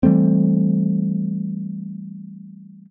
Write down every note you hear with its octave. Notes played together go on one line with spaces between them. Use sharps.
E3 G3 A3 C4